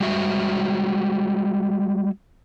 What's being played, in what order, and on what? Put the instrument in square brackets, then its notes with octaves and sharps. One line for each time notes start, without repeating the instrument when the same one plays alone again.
[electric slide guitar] G3 G#3 F#4 E5